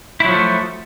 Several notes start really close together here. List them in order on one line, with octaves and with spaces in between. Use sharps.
E4 F#3 F3 A3